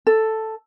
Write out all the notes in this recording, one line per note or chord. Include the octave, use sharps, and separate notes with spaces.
A4